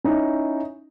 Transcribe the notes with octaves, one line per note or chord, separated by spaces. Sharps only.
C#4 D#4 E4